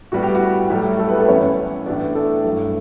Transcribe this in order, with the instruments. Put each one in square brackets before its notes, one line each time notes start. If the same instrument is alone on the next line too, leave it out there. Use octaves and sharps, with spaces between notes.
[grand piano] A2 G3 B3 F#4
G4
F#4
A2 F#3 G3 A3 G4
A3 A4
B3 B4
A3 A4
F#2 E3 B3 C#4 C#5
A2 E3 B3 D4 D5
A3 A4
G2 F#3 A3